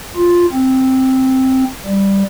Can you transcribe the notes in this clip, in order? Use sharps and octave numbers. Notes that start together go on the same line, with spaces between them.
F4
C4
G3